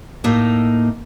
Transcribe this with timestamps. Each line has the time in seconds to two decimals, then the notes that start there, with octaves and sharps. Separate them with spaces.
0.24 A2 A3 A#3 D#4